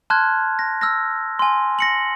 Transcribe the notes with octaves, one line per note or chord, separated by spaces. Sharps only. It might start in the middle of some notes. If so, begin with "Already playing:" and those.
A5 C6 F6 F#6 G#6
A#6
E6 F6 A#6
G#5 C6
A#6 C#7 F#7